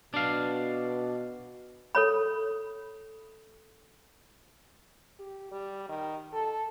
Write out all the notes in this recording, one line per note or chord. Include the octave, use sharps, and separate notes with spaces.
B2 D4 F5
A4 C#5 B5
G4
G3
D#3
A4